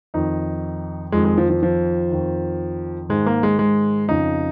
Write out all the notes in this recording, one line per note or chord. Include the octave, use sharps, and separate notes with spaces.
F2 D#3 D#4
F2 D#3 G#3
G#3
F3
F3
F3
F2 D#3
G#2 D#3 G#3
A#3
G#3
G#3
F2 C#3 D#4